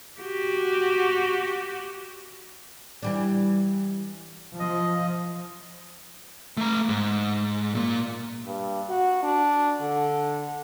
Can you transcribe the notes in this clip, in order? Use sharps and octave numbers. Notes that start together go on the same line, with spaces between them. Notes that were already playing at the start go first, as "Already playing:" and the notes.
F#4 G4
E3 G3 D4
F3 D#5
A3 A#5
G#2
A#2 A#3
G2
F#4
D4
D3